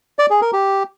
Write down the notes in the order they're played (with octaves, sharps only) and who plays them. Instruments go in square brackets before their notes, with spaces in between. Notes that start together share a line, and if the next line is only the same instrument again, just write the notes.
[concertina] D5
G#4
A#4
G4